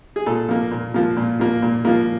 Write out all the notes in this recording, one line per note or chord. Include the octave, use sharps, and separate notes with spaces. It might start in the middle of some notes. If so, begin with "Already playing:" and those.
G#4
A#2 A4
F3 A#3
A#2
F3 A#3
A#2
F3 A#3
A#2
F3 A#3